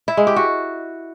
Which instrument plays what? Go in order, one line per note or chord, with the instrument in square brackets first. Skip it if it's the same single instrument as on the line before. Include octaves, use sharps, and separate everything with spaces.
[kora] E4
G#3
G4
F#4